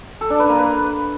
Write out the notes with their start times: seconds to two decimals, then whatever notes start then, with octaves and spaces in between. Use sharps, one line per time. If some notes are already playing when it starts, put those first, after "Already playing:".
0.21 A4
0.30 D4
0.40 B4
0.49 A#3
0.58 B4